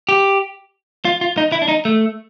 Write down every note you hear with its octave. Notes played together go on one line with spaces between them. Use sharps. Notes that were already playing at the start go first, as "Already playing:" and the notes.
G4
F4
F4
D#4
E4
D4
D#4
A3